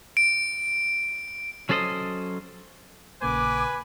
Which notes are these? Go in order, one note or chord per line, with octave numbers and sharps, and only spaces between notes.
D7
F#3 C#4 A4 C5 D5 D#5
A#1 C#3 A#3 B4 G#5 D6